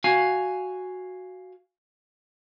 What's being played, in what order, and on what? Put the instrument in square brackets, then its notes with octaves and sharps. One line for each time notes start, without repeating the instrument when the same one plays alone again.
[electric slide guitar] F#4 F5 G#5